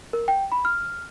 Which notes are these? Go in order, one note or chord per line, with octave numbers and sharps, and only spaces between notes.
A#4
G5
B5
F6